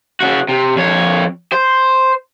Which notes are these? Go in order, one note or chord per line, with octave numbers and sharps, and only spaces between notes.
C#3 F#4
C3
F2 C#5
C5